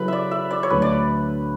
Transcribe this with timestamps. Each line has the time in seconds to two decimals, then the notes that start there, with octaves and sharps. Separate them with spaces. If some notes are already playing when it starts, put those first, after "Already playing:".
Already playing: C#3 F#3 C#4 E4 A4 B4
0.08 D5 E5
0.31 E5
0.51 D5
0.63 C#5
0.70 D2 D3 F#3 B4
0.82 D5